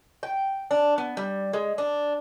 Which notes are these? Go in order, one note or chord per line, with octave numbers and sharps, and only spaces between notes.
G5
D4
B3
G3
G#3
D4